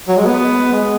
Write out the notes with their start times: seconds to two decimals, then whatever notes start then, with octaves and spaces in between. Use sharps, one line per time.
0.08 F#3
0.17 G#3
0.26 B3
0.72 G#3